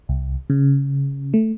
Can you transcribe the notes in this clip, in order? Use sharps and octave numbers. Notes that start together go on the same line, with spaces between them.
C2
C#3
A3